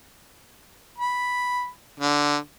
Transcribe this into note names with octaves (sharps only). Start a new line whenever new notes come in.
B5
D3